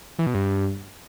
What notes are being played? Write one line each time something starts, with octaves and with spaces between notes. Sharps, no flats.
E3
B2
G2